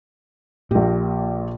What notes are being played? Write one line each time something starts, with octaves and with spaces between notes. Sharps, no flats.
A#1 A#2 G4